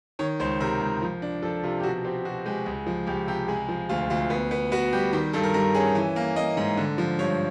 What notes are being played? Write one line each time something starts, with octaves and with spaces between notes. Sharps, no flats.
D#3 C#5
C#2 C5
C3 A#4
C#2
F3
D4
F3 A4
C3 F4
G4
B2 F#4
C4 G4
B2 F#4
G#3 G4
C#2
F3
C#2 G4
C3 G4
G#3 G#4
F3
D2 F4
D2 F4
B3
B3
B3 F#4
G3 G4
D#3 G4
G2 A4
A#4
G2 A#4
C#4 G#4
E3
A#3
A#3 D#5
G#2
D3
F3
G2 C#5